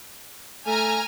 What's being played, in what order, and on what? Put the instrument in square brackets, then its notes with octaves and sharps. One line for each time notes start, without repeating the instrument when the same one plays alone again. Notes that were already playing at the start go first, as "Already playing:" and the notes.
[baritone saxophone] A3 [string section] G#5 A#5 F6